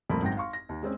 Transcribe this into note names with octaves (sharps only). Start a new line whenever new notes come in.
C2 F2 A#2 A3 A#4 B5
G#1 F#2 G5 A#6
F5 C6 C#6
A#6
D#2
G#3 C4 C#4